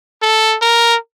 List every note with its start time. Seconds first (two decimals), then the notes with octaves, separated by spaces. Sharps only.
0.22 A4
0.62 A#4